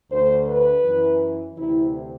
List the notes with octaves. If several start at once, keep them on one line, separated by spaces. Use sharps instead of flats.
D2 D3 C5
B4
F#2 E3
D2 C3 E3 E4